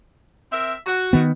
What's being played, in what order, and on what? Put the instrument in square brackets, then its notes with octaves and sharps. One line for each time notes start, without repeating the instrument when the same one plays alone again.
[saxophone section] C4 A#4 E5
F#4
[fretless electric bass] D#3 B3